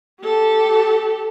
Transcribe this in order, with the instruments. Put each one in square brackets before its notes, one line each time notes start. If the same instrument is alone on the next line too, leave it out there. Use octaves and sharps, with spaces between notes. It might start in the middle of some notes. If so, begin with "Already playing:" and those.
[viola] G4 A4